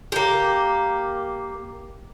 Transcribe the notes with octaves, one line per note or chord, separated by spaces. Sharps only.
A#3 G4